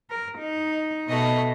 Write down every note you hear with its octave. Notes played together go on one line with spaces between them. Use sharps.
A#4
D#4
B2 A3 D#5